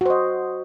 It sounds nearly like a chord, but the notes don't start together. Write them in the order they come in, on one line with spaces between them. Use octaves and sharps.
F#4 C5 D#5